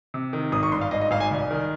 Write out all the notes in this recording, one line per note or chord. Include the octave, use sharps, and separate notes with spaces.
C3
D#3
G#1 D#6
C#6
G2 C6
F5
G#1 D#5
D#5
G#1 F5
G#5
C2
D#3